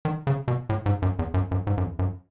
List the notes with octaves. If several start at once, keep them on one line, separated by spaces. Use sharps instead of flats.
D#3
C#3
B2
A2
G#2
F#2
E2
F#2
F#2
G#2
F#2
E2
F#2